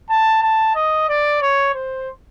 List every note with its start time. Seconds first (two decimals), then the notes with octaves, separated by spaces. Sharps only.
0.10 A5
0.42 A5
0.75 D#5
1.08 D5
1.41 C#5
1.74 C5